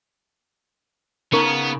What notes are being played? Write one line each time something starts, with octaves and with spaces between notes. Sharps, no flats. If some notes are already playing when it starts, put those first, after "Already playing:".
C#3 B3 D#4 A#4 C#6